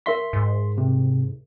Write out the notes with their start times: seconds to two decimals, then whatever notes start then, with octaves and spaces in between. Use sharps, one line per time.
0.06 A#4 E5 C6 C#6 B6
0.33 G#2
0.78 C3